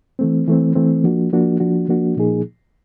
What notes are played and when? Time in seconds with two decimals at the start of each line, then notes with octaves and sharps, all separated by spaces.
0.19 E3 A3 C4
0.47 E3 A3 C4
0.75 E3 A3 C4
1.04 F3 A#3 D4 F#4
1.32 F3 A#3 D4 F#4
1.60 F3 A#3 D4 F#4
1.88 F3 A#3 D4 F#4
2.17 A#2 F3 A#3 D#4 G#4